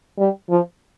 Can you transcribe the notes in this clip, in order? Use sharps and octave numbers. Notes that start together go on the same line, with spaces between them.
G3
F3